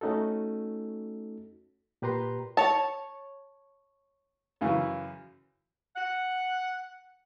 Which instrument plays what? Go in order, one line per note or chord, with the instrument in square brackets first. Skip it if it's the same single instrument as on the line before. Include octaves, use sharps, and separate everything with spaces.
[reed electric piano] A3 C#4 D#4 F#4 A4
A#2 G4 B4 A#5 C6
[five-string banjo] C#5 A5
[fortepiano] F#2 C#3 E3
[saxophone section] F#5